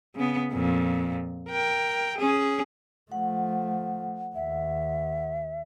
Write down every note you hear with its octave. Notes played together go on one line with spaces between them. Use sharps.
C#3 B3
F2 A#2
A#4 G5
C#4 G#4
F3 A3 F#5
D#2 E5